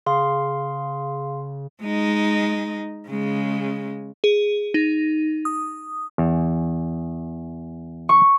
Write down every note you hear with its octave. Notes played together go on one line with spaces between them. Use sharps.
C#3 G#4 F5 C6
G#3 D#4
C#3 G#3
G#4
D#4
D#6
E2
C#6